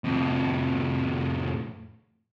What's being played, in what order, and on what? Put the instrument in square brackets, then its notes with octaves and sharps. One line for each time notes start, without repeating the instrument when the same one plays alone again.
[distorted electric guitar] F2 A2